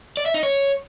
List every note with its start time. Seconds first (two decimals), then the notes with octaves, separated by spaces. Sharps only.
0.17 D5
0.26 E5
0.34 D#4
0.43 C#5